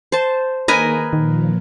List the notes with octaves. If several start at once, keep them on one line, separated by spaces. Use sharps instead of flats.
C5 A5
D#3 A#3 G#4 A#4 B4 D#5 G#5
A#2 D#3 F3